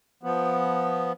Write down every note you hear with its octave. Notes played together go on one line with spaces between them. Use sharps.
F3 B3